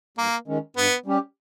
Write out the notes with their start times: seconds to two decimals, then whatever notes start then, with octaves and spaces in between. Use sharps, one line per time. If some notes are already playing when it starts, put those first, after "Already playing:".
0.18 G2 A#3
0.48 D#3 G#3 C#4
0.77 G2 B3
1.06 G3 C#4 G4